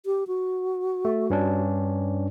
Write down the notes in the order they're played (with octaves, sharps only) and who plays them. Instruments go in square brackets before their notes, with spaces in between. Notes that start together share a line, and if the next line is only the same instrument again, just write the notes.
[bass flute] G4
F#4
[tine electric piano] A3
G2 C#4 D4